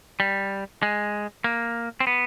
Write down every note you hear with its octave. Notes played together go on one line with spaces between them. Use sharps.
G3
G#3
A#3
C4
B3